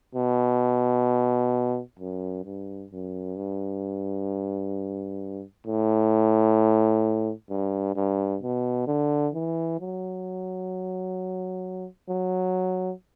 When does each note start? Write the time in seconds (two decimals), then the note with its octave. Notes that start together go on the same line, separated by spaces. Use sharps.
0.15 B2
1.99 F#2
2.45 G2
2.91 F#2
3.36 G2
5.67 A2
7.50 G2
7.95 G2
8.42 B2
8.87 D3
9.34 E3
9.80 F#3
12.09 F#3